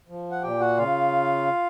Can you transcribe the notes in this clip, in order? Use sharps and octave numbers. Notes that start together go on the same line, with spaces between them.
F3
F#5
A#2 G4 G5
F#4 F#5
C#3 F4 F5